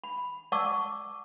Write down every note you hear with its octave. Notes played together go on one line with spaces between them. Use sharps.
B5
D5 F#5 A5 C#6 D6 E6